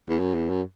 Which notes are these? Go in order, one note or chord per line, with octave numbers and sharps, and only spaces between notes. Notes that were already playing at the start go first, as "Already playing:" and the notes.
E2
F#2
E2
F#2